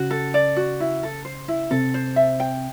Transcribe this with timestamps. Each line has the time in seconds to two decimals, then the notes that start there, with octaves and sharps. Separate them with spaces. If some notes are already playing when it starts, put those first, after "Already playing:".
Already playing: C#3 C#4 F#4
0.11 A4
0.34 D5
0.57 F#4
0.80 E4
1.03 A4
1.25 C5
1.48 E4
1.71 C3 C4 A4
1.94 C5
2.16 E5
2.40 G5